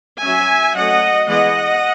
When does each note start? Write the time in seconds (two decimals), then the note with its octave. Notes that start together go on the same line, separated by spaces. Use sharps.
0.24 F#3 C#4 E5 G#5
0.76 F#3 A3 C#4 D#5 F#5
1.29 E3 G#3 B3 D#5 F#5